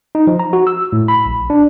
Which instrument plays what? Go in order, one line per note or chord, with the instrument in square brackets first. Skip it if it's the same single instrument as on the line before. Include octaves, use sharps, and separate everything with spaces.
[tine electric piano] D#4
F3
A#5
F#4
E6
A2
B5
A#1
D4